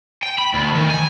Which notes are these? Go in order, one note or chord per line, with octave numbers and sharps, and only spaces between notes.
G5
B5
D2
D#3
G#5